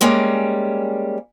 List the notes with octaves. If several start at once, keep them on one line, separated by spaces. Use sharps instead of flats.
G3 G#3 A#3 C#4